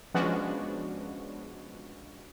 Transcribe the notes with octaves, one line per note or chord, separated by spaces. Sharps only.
F3 G#3 B3 C#4 D4 F#4